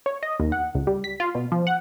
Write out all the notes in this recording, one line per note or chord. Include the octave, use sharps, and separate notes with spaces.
C#5
D#5
D#2
F#5
C#2
G3
B6
F4
B2
F3
F#5